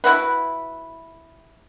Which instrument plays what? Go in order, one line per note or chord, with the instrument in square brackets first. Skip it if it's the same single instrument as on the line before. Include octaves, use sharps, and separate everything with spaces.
[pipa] E4 F#4 B4